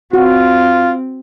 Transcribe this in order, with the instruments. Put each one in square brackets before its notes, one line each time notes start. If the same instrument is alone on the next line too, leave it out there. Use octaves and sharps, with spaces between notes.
[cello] C4 [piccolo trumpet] F4 [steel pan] F#4